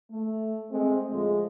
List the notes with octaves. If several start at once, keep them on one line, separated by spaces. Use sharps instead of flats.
A3
G#3 A3 C4
A2 D3 F3 G#3